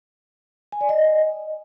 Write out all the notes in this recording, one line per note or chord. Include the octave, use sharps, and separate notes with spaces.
G#5
D5
D#5